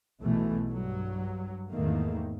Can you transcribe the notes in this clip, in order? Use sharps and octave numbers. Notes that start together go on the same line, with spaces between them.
B1 E2 B2 E3 A3
G2 F#3
E2 G#2 D#3 A3 A#3